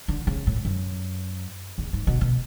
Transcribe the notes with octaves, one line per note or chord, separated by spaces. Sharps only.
D3
C#3
A2
F#2
E2
G#2
B2
B2